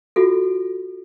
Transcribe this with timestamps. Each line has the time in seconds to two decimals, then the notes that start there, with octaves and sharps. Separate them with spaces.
0.16 F4 F#4 A4